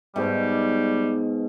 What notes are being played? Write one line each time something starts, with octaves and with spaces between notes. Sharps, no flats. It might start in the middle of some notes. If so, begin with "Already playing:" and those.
G#2 B2 G3